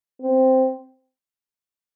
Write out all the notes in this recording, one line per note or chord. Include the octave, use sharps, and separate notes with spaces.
C4